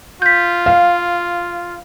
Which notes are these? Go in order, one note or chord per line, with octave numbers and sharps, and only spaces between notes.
F4 G6 B6
F5